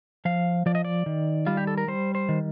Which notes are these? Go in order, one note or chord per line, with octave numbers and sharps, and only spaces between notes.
F3 F5
F3 D5
D#5
D5
D#3
G3 F4
G4
A4
A#4
G3 C5
C5
D#3